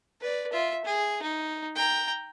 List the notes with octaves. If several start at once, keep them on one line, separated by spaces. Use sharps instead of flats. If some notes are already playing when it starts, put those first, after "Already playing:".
B4 D5
F4 E5
G#4
D#4
G5 A#5